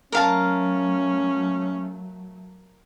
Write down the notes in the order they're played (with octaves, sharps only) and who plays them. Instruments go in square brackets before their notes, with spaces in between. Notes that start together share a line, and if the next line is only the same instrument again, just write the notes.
[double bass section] F#3 A3 [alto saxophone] C#4 [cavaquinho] A#4 F5 A5